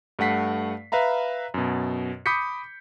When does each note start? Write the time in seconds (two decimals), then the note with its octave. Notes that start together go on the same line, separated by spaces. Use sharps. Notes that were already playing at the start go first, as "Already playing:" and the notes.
0.19 G2 A3 F#5 B6 C7
0.92 B4 E5 F5 A#5 B5
1.54 F#2 B2
2.26 B5 D6 D#6 G6 B6 C#7